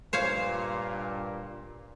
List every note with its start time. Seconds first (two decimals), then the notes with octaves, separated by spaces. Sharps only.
0.13 G2 A#2 C5 C#5 F5